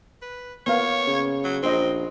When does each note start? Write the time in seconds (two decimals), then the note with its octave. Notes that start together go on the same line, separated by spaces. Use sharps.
0.22 B4
0.67 A#3 B3 C#5 F5
1.07 C#3
1.44 F#3
1.63 A#1 C4 C5 D#5